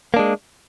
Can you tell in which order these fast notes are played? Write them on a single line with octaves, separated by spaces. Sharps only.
A#3 D4 G#3